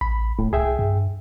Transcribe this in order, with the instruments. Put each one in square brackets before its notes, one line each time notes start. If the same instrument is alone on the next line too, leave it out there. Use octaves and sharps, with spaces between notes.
[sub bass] A1 [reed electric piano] B5
[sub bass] D1 [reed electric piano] A2
[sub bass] C2 [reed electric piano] G#4 E5 G5
[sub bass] G2